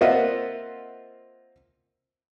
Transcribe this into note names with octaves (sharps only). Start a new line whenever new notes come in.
A#3 C4 F4 D#5 E5 F#5